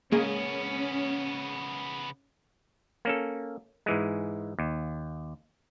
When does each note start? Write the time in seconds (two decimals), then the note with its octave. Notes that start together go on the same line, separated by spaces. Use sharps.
0.12 C#3 G#3 A#3 B3 C#4 G#4
3.05 A#3 C#4 A4
3.86 G#2 E3 G#3
4.59 D#2